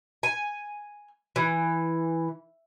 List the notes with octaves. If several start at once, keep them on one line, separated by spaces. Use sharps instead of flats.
G#5
E3